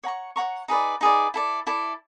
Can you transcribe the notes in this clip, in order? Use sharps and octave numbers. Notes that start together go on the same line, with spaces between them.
C#5 F#5 A#5 C#6
C#5 F#5 A#5 C#6
D#4 G#4 B4 D5
D#4 G#4 B4 D5
E4 A4 D5
E4 A4 D5